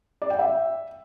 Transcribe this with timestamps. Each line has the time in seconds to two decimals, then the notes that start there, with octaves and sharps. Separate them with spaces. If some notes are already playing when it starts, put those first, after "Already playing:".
0.22 D5
0.30 G5
0.39 E5